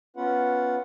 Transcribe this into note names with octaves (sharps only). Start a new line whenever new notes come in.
B3 C#4 F4 B4 F#5